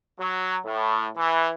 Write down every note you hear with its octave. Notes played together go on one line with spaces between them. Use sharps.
F#3
A2
E3